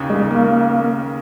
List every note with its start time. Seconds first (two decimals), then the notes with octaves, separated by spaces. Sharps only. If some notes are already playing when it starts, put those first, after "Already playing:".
Already playing: D#2 C#3
0.10 G#3
0.31 A#3